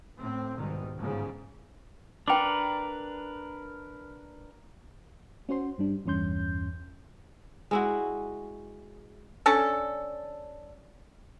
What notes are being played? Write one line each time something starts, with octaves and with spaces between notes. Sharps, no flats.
A2 C4
C2 G#2 B2 D#3
G1 G#2 C#3
D4 A#4 B4 G5 D6
C#4 F#4 C5 C6
G2 G3 D4
A1 E2 G2 C#4 C6 G6
G#3 E4 F#4
C#4 D4 A4